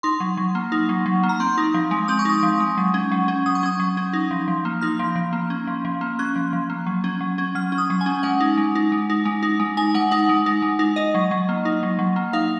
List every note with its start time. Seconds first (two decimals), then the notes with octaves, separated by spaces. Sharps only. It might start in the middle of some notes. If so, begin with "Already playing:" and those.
0.03 D#4 C6
0.20 F#3
0.37 F#3
0.55 A#3
0.72 D#4
0.89 F#3
1.06 F#3
1.23 A#3
1.29 A#5
1.40 C4 C6
1.58 D#4
1.74 F3
1.91 G#3
2.08 C4 D#6
2.19 C#6
2.25 D#4 D#6
2.43 F3
2.60 G#3
2.78 F#3
2.94 C#4
3.12 F#3
3.28 C#4
3.46 F#3 D#6
3.55 C#6
3.63 C#4 D#6
3.80 F#3
3.97 C#4
4.13 D#4
4.31 F3
4.48 F3
4.65 A#3
4.81 D#4 F6
4.99 F3
5.16 F3
5.33 A#3
5.50 C#4
5.67 F3
5.85 F3
6.01 A#3
6.19 C#4 F#6
6.36 F3
6.53 F3
6.70 A#3
6.86 F#3
7.04 C#4
7.21 F#3
7.38 C#4
7.55 F#3 F6
7.72 C#4
7.78 D#6
7.90 F#3
8.01 G#5
8.06 C#4
8.23 G#3 F#5
8.40 D#4
8.57 G#3
8.75 D#4
8.92 G#3
9.10 D#4
9.25 G#3
9.43 D#4
9.60 G#3
9.77 D#4 G#5
9.94 G#3 F#5
10.11 D#4 F#5
10.29 G#3
10.46 D#4
10.62 G#3
10.79 D#4
10.96 D#4 D#5
11.15 F#3
11.31 F#3
11.49 A#3
11.65 D#4
11.83 F#3
11.99 F#3
12.16 A#3
12.33 D#4 F5